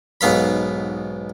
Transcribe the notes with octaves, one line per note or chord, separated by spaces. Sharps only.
B1 G#2 B3 F5 B5